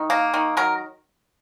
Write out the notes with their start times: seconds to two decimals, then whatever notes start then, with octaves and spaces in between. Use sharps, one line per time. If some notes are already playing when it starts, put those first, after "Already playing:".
Already playing: D#3
0.10 A#3
0.34 D#3
0.57 F#3 A#4